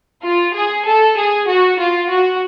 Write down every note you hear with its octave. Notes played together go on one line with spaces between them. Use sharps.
F4
G#4
A4
G#4
F#4
F4
F#4